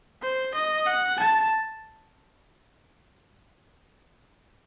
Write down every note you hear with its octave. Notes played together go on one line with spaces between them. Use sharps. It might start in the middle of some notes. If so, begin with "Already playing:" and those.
C5
D#5
F#5
A5